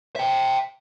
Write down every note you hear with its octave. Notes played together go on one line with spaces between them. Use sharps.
E5 G5